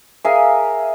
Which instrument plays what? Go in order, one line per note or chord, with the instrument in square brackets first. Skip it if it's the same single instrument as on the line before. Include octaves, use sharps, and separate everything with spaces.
[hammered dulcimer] G#4 A#4 E5 F5